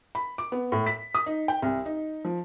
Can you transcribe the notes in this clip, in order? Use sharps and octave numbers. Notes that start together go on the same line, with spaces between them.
B5
D6
B3
A2
B6
D#6
D#4
G5
C2
D#4
F3